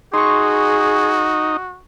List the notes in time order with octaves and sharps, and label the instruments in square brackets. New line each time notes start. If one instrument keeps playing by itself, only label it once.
[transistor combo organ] D#4 [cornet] F#4 [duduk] G#4 [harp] C6 C#6